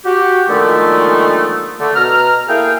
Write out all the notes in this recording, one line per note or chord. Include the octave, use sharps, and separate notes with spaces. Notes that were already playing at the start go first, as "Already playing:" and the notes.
F#4 G4
A#2 D3 D#3 F3 G#3 A3
D3 A3
B2 A#5 F6
A#3 E4 G#4 A4 F5 G5